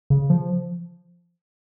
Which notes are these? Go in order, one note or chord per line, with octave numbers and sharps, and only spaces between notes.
C#3
F3